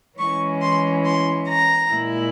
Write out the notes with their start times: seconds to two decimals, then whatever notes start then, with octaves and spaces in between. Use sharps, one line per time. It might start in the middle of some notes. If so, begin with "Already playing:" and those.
0.18 E3 G#3 C#4 E4 C#6
0.61 C6
1.05 C6
1.48 A#5
1.91 A#2 G#3 E4